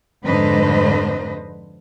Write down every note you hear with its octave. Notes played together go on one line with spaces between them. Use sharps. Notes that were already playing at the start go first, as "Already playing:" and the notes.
F2 G#2 D3 B4 C5 D#5